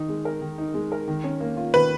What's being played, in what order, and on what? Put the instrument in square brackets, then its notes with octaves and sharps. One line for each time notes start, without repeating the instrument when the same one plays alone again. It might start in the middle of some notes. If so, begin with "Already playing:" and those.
Already playing: [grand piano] D#3 D#4
G#3
A#4
D#3
D#4
G#3
A#4
D#3
C#4
A#3
F4
[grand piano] D#3 [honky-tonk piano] B4